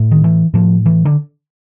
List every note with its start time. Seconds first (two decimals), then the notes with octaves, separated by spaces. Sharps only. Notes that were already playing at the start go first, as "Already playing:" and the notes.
Already playing: A2
0.11 D#3
0.24 E3
0.54 A2 F3
0.86 E3
1.05 D3